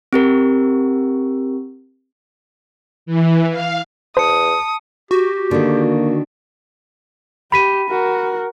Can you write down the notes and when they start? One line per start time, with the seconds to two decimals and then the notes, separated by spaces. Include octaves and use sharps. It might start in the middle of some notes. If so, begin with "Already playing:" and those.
0.13 C4 G4 A#4
3.06 E3
3.51 F5
4.17 E2 C5 A5 D#6 C#7
5.11 F#4 G4
5.51 D3 D#3 A#3
7.52 G4 B5 B6 D#7
7.90 F#4 A#4